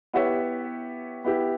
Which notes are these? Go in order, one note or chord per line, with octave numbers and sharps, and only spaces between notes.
B3 E4 G4 C#5 E5
B3 E4 G4